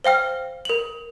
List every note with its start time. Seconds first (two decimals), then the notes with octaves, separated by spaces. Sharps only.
0.04 C5 F5 G5 F6
0.65 A#4 F#7